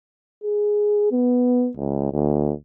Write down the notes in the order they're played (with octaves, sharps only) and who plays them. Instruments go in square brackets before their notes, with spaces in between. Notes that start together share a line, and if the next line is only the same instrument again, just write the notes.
[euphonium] G#4
B3
C#2
D2